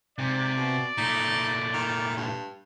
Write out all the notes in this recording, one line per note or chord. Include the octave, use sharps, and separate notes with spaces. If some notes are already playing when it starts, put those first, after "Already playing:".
G#2 C3 D5
B2
A#2 A3 D#4
D#3
G2